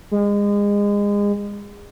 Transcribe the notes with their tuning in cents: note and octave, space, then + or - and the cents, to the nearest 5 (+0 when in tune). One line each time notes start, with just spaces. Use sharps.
G#3 -30